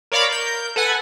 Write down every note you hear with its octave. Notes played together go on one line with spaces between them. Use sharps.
A#4 C#5 D5 F5 A#5 B5
A#4 G6
A4 B4 F#5 G#5